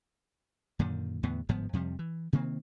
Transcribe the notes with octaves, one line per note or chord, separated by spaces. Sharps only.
F#2 A#2 D3 D#3
E2 A2 D3 B3
G1 G#2 F3 B3
F2 C3 F3 G3
E3
C3 D#3 A#3 C4